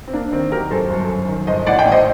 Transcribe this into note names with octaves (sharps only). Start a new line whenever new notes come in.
C4
A#3 D4
D#3 C4
F#3 G4 A#4
F#2 A4 C5
G1
F#2
D#3
G1 C5 D#5
A1 D5 F#5
D#5 G5
A2
C5 D#5